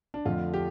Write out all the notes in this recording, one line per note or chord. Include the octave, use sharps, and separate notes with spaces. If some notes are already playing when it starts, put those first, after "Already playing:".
D4
F2 D3 F3 A3 F4
G4